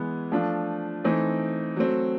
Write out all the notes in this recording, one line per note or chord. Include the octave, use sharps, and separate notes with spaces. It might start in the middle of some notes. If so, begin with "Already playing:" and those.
Already playing: E3 G#3 B3
F3 A3 D4 F4
E3 A3 C4 D#4
F#3 A3 C4